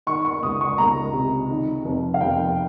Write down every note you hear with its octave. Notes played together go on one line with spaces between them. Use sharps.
D#3 C#6
C#6
C#2 D#6
C#6
C#2 A#5
C3
D#3
F1
F5
F1 G5